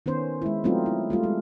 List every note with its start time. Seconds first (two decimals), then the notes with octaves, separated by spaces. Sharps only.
0.06 D#3 B3 C#4 C5
0.42 G#3 E4
0.64 F#3 A3 B3 C4 D#4 F4
0.86 E4
1.10 G3 A3 F4
1.23 G#3